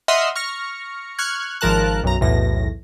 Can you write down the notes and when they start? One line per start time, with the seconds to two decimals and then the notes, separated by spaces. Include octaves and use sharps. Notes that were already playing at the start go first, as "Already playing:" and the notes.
0.08 D#5 E5 F#5 C6 D#6 F6
0.36 C#6 F6 A#6 C#7
1.18 C#6 F6 F#6 G#6
1.61 G#1 F3 A#4 A5 F#6
2.04 B1 F#2 A#5
2.21 B1 E2 A2 A#6